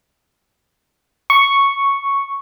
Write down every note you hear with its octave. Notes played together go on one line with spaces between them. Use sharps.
C#6